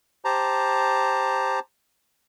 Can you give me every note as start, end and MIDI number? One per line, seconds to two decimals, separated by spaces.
0.25 1.59 67
0.25 1.59 72
0.25 1.59 81
0.25 1.59 82